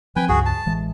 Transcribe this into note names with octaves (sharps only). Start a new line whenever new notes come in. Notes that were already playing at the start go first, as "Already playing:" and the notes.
F3 C4 B4 G5 G#5
C#2 G2 F#4 G#4
A5
A1 E3 G#3